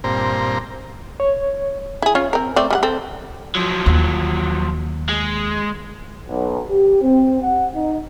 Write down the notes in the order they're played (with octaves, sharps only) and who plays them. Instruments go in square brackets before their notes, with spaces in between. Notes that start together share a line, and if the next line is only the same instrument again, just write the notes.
[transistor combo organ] G2 A#2 C4 C5 A#5
[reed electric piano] C#5
[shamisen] E4 G#4
C#4 F4 C#5
C4 A#4
A3 C4 D5
G3 G#4 F#5
C4 A4
[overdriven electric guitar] F3 F#3
[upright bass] D#2
[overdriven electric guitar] G#3
[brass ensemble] B1
G4
C4
F#5
D#4